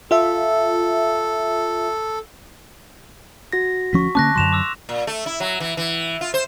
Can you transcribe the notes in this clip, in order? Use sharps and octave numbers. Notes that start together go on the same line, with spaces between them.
F4 A4 E5
F#4 A#6
D2 F3 C#4 C#6 B6
D3 A#3 C#4 A5 D6 F#6 A#6
F#2 D3 F#3 C6 E7 F7
D6 E6
A#2
A3
E4
F#3
E3
E3
F4
C5